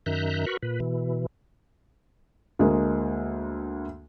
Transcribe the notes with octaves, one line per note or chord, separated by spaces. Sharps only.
F#2 D#3 E5 A#5 F#6 G6
F#4 A#4 B4 B5 C#6
A#2 B4
B2 E3
D2 G#3 A#3